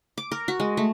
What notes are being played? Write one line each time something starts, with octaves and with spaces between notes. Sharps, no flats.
D6
A#4
F#4
G#3
A3